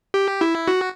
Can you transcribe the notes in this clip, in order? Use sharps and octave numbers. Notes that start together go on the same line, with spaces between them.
G4
E4
F#4